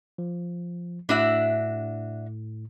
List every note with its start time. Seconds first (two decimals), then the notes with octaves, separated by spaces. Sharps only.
0.18 F3
1.09 A2 D4 F#4 E5